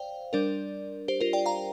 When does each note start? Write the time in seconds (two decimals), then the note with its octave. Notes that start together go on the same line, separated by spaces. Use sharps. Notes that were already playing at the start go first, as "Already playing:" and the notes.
Already playing: C5 D5 F5 G5
0.33 G3 D4 A#4 D5
1.08 G4 C5
1.21 F4 A#4
1.33 D5 G5
1.46 F5 A#5